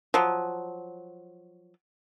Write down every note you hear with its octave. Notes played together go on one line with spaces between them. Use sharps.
F3 F#3